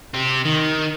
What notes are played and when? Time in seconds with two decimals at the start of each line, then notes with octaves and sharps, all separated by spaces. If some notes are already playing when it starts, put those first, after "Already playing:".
0.14 C4 G4
0.46 D#3